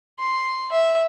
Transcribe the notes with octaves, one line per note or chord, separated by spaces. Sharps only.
C6
E5